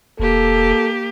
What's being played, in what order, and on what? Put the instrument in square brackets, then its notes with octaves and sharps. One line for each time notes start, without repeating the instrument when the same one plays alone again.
[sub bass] E1 [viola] A#3 G4 [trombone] A4